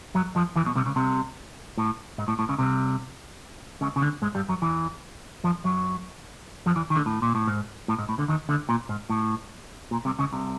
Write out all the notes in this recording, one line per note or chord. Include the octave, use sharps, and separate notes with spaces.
F#2 F#3
F2 F3
E2 E3
B1 B2
C2 C3
C#2 C#3
C2 C3
A2
G#2
A2
A2
C#2 C#3
C2 C3
C#2 C#3
C#3
D2 D3
G#2 G#3
G2 G3
F#2 F#3
E2 E3
F2 F3
F#2 F#3
F2 F3
E2 E3
D#3
D2 D3
A2
A#2
A2
G#2
A2
G#2
A2
D2 D3
D#2 D#3
D2 D3
A#2
G#2
A2
A#2
C2 C3
C#2 C#3
C2 C3